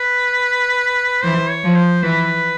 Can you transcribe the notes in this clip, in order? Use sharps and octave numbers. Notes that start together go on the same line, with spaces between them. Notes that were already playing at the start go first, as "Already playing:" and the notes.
Already playing: B4
E3 C5
C#5
F3
C5
E3 B4